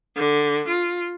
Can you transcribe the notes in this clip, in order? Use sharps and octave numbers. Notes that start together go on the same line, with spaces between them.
D3
F4